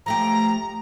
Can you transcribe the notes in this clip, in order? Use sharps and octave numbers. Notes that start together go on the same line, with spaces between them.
F3 A3 G4 A#5